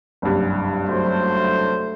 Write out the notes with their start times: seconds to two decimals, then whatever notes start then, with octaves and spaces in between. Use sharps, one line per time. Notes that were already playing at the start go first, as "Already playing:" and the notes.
0.22 F#1 C2 G2
0.89 F#3 A3 C5